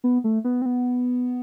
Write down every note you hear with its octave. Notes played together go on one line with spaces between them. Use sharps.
B3
A3
B3
C4
B3